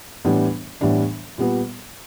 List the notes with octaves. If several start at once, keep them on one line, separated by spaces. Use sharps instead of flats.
A2 E3 G3 B3 D4
A2 E3 G3 B3 D4
A#2 G3 B3